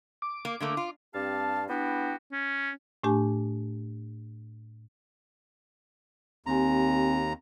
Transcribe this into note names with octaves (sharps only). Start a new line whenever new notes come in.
D6
A#3
D3 A3 A#3
F4
G2 C4 G4 F5 A5
B3 D4 E4 F#4 G4 G5
C#4
A2 A3 D4 G4 G#5
D#2 C4 G4 G#5 A#5